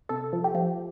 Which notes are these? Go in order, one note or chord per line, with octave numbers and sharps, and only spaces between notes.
C3 A4
F3
G4
F3